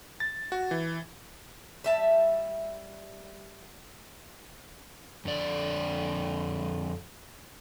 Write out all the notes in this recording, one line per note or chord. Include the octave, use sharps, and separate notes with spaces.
A6
F#4
E3
G3 E5 A5
F2 D3 D5